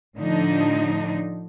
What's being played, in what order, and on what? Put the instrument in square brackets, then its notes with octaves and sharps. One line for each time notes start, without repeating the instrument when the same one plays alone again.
[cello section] A2 D3 F3 D4 D#4